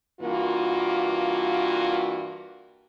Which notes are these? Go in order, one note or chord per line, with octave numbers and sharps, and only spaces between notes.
G2 E3 A#3 F4 F#4